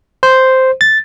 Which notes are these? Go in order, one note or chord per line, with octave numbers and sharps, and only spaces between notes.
C5
A6